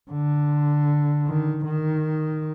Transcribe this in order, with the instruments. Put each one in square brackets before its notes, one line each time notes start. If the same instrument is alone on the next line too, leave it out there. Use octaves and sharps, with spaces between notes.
[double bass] D3
D#3
D#3